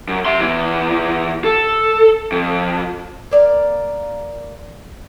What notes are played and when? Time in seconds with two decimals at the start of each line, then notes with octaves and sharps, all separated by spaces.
0.08 F#2
0.25 E5 C6
0.40 E2 E3
1.44 A4
2.32 F2
3.31 A#3 D5 F5